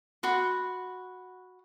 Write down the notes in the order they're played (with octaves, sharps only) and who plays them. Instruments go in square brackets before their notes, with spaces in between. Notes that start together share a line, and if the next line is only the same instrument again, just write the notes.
[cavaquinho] F#4 B5 C6